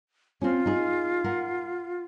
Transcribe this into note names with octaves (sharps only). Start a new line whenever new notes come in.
C4 C#4 F4
D#4 G#4
A#4 F#5